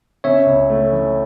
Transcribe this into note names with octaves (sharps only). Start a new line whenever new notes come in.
C#3 C#5 E5
C#2
A3
E3